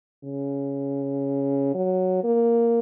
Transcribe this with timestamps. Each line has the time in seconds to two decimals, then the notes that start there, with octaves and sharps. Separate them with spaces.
0.24 C#3
1.74 F#3
2.24 A#3